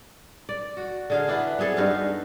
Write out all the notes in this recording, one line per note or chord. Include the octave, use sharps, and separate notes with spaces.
D5
F#4
D3 G#4 F5
B3 D4 E4 B4
B3 C4 G#4 A4
G2 D#4 B4 F5